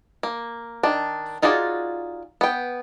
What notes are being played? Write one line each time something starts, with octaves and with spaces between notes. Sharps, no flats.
A#3
D#3 D4
D#4 F4 F#4 G#4 D5
B3 G5